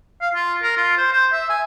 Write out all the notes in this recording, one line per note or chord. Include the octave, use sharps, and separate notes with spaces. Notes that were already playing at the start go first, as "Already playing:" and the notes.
F5
F4
A#4
F4
C5
C5
E5
G#5